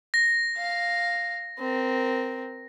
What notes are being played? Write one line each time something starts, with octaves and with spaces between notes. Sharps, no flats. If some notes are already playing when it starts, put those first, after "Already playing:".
A#6
F5
C4 A#4